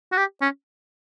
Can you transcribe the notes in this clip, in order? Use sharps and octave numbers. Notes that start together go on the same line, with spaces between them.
F#4
G4
C#4